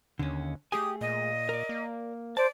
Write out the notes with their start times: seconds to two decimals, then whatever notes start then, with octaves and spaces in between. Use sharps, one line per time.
0.19 D#2 D3 C#4
0.72 A3 G4 G#4 G#5 D#6
1.01 A#2 D#5
1.49 A#4 D5
1.69 A#3
2.37 C5 D5 A5